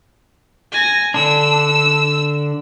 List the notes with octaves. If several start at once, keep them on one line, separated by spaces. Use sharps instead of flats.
G#5 A#6
D3 D4 E6